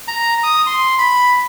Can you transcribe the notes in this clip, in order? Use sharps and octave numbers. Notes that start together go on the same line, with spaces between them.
A#5
D#6
C6
B5